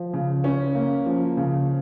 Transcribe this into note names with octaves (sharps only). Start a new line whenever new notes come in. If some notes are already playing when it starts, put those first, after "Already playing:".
Already playing: F3
C#3
C#4
A#3
F3
C#3